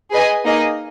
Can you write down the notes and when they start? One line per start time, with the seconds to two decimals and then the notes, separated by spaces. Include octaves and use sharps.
0.11 G#4 B4 D#5 G#5
0.44 A#3 D#4 G#4 D#5